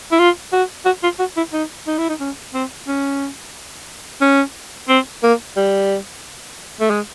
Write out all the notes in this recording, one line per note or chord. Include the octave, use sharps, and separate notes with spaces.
E4
F4
F#4
F#4
F4
F#4
E4
D#4
D#4
E4
D#4
C#4
C4
C#4
C#4
C4
A#3
G3
A3
G#3